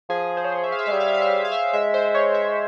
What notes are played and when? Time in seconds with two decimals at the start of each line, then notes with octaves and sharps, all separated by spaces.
0.09 F3 G#4
0.37 C5
0.44 C#5
0.52 C5
0.64 E5
0.72 F5
0.79 E5
0.86 G#3 F5
0.92 G3 E5
1.00 F5
1.08 E5
1.15 F5
1.22 E5
1.29 F5
1.38 E5
1.45 F5
1.52 E5
1.73 G#3 E5
1.94 C5
2.15 C#5
2.34 E5